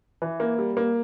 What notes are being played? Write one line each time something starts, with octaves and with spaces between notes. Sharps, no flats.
E3
A#3
G3
A#3